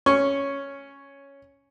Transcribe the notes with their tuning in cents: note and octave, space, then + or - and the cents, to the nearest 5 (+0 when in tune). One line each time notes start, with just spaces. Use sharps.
C#4 +0 C#6 +0